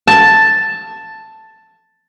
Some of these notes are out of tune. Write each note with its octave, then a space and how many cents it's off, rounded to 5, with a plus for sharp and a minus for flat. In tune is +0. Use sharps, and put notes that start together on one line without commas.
A5 +5